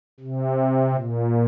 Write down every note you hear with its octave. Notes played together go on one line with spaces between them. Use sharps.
C3
A#2